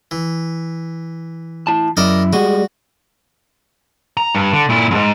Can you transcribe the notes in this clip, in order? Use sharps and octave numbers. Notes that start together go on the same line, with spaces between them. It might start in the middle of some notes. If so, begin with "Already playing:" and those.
E3
E4 A5
F#2 E4 A#4 D5 D#5
G3 G#3 F#4
A#5
G2
D3
A#2 E4
F2 G#2